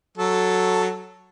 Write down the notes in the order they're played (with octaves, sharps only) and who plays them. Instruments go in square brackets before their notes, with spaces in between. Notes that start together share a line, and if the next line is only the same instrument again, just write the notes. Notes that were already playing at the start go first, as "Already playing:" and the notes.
[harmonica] F#3 A4